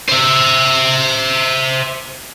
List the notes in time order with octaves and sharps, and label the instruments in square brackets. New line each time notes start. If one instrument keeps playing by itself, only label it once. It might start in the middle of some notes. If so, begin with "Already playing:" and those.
[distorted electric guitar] C5 E5